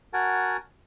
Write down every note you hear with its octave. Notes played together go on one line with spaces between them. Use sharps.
F#4 A#4 F#5 G#5 A5